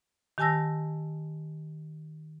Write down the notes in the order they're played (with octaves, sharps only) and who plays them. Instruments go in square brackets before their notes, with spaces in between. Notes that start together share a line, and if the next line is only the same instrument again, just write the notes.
[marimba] D#3 G4 G#5 A5 E6 A#6